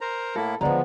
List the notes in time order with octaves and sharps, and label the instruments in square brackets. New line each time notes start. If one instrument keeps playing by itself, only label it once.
[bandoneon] A#4 C5 A#5
[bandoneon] A2 A#3 E4 [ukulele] A4
[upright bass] D3 E3 [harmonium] F3 B3 [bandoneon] G#3 [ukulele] D5 A#5